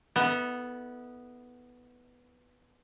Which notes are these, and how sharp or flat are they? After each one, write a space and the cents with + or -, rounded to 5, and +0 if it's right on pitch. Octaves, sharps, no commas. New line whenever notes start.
B3 +0 E4 -35 A4 +0